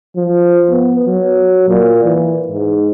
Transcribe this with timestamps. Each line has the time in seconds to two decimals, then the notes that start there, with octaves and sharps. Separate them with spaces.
0.16 F3
0.71 B3
1.06 F#3
1.69 A#2
2.04 E3
2.48 G#2